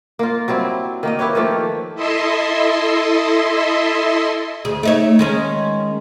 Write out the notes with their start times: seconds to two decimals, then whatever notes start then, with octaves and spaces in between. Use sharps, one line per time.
0.19 A#3 F4
0.48 F#3 G3 C4 E4
1.03 D#3 A#3 D#5
1.19 E4 G4 B4 C#5
1.35 D#3 F3 A3 A#3
1.95 E4 A4 D#5 E5 C6
4.65 D2 G#4
4.83 A3 D#4 C#5
5.19 D#3 G#3 C#4